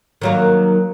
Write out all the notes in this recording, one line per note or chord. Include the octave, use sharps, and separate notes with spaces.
D#3 F#3 A#3